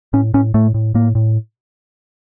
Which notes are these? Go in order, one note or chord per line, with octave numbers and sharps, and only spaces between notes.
A2 C#4
A2 C#4
A2 A3
A2
A2 A#3
A2